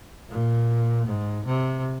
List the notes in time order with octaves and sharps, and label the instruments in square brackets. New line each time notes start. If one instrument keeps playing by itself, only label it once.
[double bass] A#2
G#2
C3